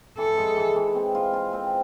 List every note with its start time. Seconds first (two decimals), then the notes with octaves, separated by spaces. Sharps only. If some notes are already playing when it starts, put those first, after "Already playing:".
0.18 E3 A4
0.37 G#3
0.57 E3
0.76 E3
0.95 C4
1.15 F4
1.33 F4
1.53 C4